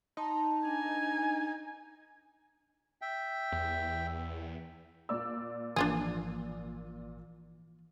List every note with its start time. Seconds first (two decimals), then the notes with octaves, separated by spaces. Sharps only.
0.17 D#4 A5 C6
0.65 D4 G#5
3.01 E5 G5
3.52 E2
5.09 A#2 D5 E6
5.76 G#1 E3 F3 A#3 D4 F4 G#4